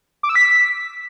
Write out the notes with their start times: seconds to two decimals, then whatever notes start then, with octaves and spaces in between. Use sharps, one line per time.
0.23 D6
0.29 E6
0.36 B6